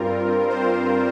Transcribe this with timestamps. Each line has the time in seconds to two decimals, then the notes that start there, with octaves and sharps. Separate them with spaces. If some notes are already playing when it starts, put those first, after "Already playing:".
Already playing: G2 G3 C4 F4 A#4
0.50 C5